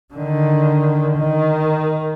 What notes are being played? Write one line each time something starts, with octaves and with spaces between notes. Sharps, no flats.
D3 D#3
D#3